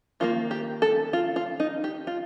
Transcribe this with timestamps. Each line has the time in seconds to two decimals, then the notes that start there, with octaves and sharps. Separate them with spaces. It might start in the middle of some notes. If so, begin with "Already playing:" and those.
0.20 D#3 G3 A#3 F4
0.51 G4
0.82 A4
1.13 F4
1.36 F4
1.60 D#4
1.84 G4
2.07 F4